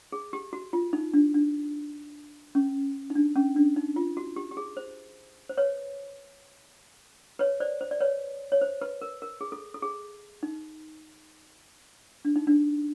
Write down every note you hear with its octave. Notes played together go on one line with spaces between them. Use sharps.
G#4
G4
F#4
F4
D#4
D4
D4
C#4
D#4
D4
C#4
D4
D#4
F4
F#4
G4
G4
G#4
C5
C5
B4 C#5
B4 C#5
C5 D5
C5
D5
B4 C#5
C#5
C5
B4
A#4
A#4
G#4
A4
A4
G#4
D#4
D4
D#4
D4